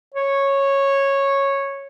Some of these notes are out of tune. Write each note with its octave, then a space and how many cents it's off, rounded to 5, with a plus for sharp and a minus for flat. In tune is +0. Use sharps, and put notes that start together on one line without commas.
C#5 -10